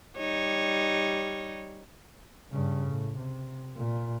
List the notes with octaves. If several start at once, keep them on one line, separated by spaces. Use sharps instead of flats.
G3 D#4 C#5
G2 C#3
A2
C3
A#2